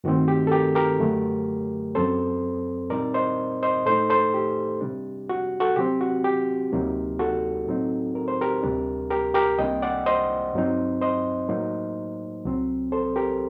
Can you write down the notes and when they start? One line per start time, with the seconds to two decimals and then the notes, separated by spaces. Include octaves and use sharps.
0.04 G2 D#3 A3 C4 D#4 F#4
0.28 G4
0.47 A4
0.52 G4 A#4
0.75 G4 A#4
1.00 F#2 D3 F#3 A3
1.95 F#2 F#3 C4 A4 C5
2.90 A#2 G3 C4 D#4 A#4 D5
3.14 C5 D#5
3.63 C5 D#5
3.86 A2 A3 D#4 A4 C5
4.10 A4 C5
4.34 G4
4.81 C3 G3 D4
5.29 F#4
5.60 F#4 A4
5.76 C3 F#3 C4 G4
6.01 F#4
6.24 G4
6.72 D2 C3 F#3 A#3 D#4
7.19 F#4 A4
7.67 A2 F#3 C4 D#4
8.15 A#4
8.28 C5
8.41 G4 A#4
8.63 D2 C3 G3 D4
9.10 G4 A#4
9.34 G4 A#4
9.58 C2 C3 G3 A#3 D4 D#5 G5
9.82 D5 F#5
10.06 C5 D#5
10.54 G2 F#3 C4 D#4
11.01 C5 D#5
11.49 A2 F#3 A#3 D#4
12.45 C2 C3 F#3 C4
12.92 A4 C5
13.16 G4 A#4